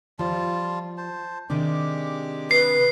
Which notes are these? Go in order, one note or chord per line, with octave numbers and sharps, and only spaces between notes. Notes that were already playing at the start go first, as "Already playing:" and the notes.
F3 G3 F4 A5
C5 A5
C3 D#3 G#3 D4 G4 D6
B4 C7